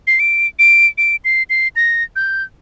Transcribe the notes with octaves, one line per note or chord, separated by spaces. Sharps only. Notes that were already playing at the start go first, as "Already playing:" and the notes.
C7
D7
D7
D7
C7
C7
A#6
G6